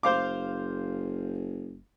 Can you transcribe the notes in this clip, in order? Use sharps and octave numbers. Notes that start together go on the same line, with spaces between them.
F#1 C5 F5 D6